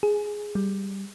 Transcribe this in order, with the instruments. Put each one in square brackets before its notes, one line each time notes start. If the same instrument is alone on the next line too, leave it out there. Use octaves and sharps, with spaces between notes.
[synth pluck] G#4
[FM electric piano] G3